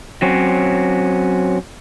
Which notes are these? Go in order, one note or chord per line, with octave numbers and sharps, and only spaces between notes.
F#3 C4 C#4